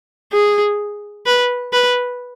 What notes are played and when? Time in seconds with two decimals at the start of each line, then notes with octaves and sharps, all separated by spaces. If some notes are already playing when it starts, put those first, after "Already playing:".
0.32 G#4
1.26 B4
1.73 B4